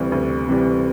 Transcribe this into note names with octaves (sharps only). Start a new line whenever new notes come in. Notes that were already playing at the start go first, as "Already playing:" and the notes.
Already playing: D2 C3 E3 G3
D2
C3 E3 G3